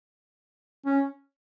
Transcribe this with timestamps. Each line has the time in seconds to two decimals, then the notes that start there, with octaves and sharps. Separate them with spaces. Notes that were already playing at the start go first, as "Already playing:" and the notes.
0.85 C#4